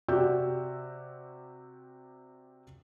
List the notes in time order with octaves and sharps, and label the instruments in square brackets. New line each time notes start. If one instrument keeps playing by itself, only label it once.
[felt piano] C3 F#4 G4 D5 E6 G6